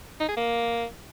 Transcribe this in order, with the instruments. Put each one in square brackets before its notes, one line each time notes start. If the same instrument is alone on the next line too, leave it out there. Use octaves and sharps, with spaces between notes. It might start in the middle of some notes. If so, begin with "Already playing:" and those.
[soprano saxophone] D#4
G#4
A#3